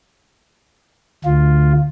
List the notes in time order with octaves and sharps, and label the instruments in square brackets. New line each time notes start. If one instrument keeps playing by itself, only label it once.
[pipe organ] D2 F4